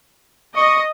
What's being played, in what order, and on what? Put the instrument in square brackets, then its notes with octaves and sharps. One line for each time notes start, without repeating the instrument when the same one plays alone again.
[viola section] D#5 [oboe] C#6